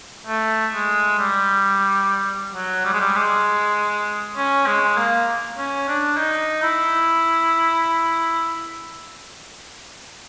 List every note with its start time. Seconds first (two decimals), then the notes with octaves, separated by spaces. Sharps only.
0.27 A3
0.73 G#3
1.19 G3
2.54 F#3
2.85 G3
2.93 G#3
3.01 G3
3.16 G#3
4.37 C#4
4.67 G#3
4.97 A#3
5.58 C#4
5.88 D4
6.18 D#4
6.63 E4